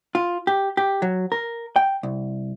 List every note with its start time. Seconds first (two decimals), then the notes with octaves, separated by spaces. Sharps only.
0.15 F4
0.47 G4
0.77 G4
1.02 F#3
1.32 A#4
1.76 G5
2.03 C2